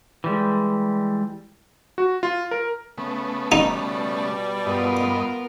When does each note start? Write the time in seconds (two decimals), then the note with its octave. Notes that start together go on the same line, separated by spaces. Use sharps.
0.24 E3 G3 G#3
1.98 F#4
2.23 F4
2.51 A#4
2.98 C#3 A3 B3
3.52 B2 G3 D#4
4.66 G2 B3 F4 A#4 B4 D#5